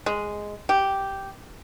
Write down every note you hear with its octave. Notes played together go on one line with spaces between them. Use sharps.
G#3
G4